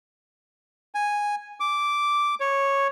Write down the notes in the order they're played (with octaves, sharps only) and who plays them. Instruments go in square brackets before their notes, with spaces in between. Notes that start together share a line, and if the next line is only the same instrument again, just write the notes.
[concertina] G#5
D6
C#5